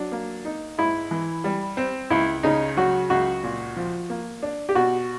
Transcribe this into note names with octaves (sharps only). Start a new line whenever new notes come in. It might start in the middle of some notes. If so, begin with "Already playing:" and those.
Already playing: F#3 D4
A#3
D#4
G#2 E4
E3
G3
C4
C#2 E4
C#3 D#4
F#3 F#4
C#2 F#4
A#2
F3
A#3
D4
G4
B2 F#4